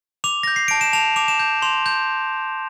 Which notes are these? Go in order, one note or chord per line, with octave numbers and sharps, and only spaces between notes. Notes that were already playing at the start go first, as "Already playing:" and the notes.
D6 F7
G6 A#6
C7
A5 D7
E7
A5 F7
D6 F7
E7
G6
C6 F7
G6